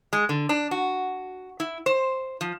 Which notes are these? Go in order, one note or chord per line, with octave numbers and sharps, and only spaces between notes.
G#3
D3
D4
F#4
E4
C5
F3